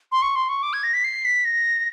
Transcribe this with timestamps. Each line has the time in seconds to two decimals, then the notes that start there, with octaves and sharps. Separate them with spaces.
0.12 C6
0.22 C#6
0.36 C6
0.49 C#6
0.63 D6
0.73 G#6
0.84 A#6
0.94 B6
1.04 C7
1.25 B6
1.45 A#6